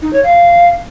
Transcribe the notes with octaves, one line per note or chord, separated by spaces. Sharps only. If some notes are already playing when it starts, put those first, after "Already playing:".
D#4
C#5
F5